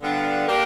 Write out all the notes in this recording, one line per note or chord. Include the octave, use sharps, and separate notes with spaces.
D3 G3 B3 D4 F4
A#3 D4 G4 A#4